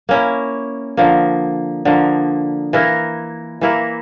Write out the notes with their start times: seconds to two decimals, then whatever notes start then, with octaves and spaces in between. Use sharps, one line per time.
0.09 A#3 C#4 E4
0.97 D3 F3 A#3
1.85 D3 F3 A#3
2.73 E3 A#3 E4 A#4
3.61 E3 A#3 E4 A#4